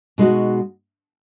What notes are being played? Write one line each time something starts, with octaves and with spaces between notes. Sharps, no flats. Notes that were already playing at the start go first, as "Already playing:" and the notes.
B2 G#3 D#4 F#4